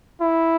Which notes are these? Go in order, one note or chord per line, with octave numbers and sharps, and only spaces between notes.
E4